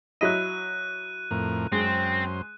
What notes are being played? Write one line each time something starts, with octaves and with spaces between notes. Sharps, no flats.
F#3 E4 D#5 F#6 D#7
F2 A2 A#4
F#2 G#3 C4 C5